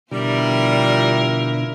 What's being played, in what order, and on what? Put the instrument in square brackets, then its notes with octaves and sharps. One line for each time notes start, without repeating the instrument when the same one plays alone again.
[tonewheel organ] B2 D3 [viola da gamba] F3 E4 A#4 [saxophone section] G3